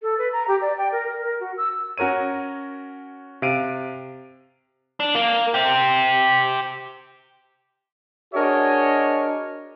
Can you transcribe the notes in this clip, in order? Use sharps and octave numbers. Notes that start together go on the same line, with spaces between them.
A4
B4
A#5
G4
D5
G5
A#4
A#4
A#4
F#4
E6
C#4 F#4 A#4 C#5 D#7
C3 F5 D7 D#7
D4
A#3
G4 C5
D4 F#4 G#4 A#4 C#5 D#5